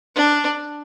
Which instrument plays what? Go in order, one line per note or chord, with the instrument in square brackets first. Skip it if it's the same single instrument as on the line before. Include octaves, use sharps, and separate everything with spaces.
[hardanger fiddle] D4